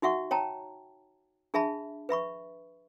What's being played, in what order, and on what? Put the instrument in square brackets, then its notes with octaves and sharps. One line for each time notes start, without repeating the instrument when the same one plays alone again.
[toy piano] D#4 F#4 E5 F#5 C#6
C#5 G5 A5 A#5
D4 G#4 E5 A5 B5
B4 E5 B5 C#6